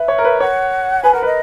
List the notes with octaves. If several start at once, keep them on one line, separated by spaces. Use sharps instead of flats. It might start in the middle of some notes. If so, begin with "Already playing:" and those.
Already playing: B4 E5
C#5
A#4
B4
C#5 F#5
B4 G#5
A#4 F#5
B4 D#5